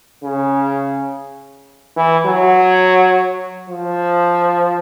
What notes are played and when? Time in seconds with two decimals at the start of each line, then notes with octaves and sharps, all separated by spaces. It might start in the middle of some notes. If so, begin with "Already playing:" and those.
0.23 C#3
1.97 E3
2.26 F#3
3.69 F3